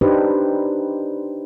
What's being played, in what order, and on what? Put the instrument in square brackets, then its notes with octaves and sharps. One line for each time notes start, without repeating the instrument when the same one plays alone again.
[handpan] D4 D#4 G4 B4 C5